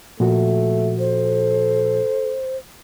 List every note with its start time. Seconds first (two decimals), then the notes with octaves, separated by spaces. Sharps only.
0.20 A#2 F3 A3 F#4
0.99 A4 C5